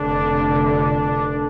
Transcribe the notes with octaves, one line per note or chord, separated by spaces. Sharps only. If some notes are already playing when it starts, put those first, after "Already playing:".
Already playing: F1 F2 D3 D4